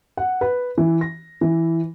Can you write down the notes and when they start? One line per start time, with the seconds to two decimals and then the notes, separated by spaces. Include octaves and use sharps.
0.17 F#5
0.41 B4
0.78 E3
1.01 A#6
1.41 E3